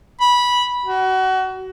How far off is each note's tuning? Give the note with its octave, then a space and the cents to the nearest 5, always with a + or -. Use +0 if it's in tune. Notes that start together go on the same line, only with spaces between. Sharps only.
B5 -15
F#4 +25